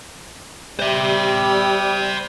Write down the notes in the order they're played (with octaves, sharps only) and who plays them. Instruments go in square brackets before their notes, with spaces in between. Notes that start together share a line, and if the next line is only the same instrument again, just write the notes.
[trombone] G3 [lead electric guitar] C5 E5